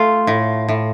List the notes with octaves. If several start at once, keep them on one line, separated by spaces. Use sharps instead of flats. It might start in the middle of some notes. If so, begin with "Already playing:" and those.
Already playing: A3 F4
A2
A2